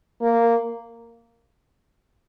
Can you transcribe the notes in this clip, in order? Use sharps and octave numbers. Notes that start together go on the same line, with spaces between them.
A#3